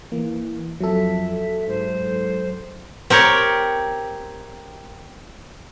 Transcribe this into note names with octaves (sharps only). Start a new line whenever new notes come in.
E3 A#3
F2 F#3 A4 E5
G#2 C5
C4 G4 A#4 C#5